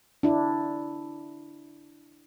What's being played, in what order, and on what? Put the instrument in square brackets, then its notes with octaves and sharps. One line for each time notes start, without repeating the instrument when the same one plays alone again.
[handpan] D4 E4